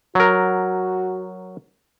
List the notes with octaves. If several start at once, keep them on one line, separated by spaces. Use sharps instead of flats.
F#3 F#4 A#4